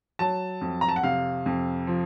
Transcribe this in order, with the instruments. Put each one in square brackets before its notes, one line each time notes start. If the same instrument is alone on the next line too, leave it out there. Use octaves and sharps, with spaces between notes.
[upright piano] F#3 A5
F2
A#5
A5
F#5
C3 F5
F2
F3